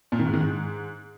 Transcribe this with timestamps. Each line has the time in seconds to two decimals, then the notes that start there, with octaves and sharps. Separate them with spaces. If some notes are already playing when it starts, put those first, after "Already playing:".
0.12 A#2
0.19 D#3
0.26 G#2
0.33 D#3
0.41 G#2